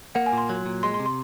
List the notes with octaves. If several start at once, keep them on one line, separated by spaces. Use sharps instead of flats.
A#3 F#5
G#5
A#2 C6
F#3
A#2
G#3 C6
C6
C3
C6